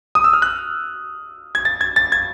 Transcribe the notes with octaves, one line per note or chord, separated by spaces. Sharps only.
D#6
E6
F6
F#6
G#6
A6
G#6
A6
G#6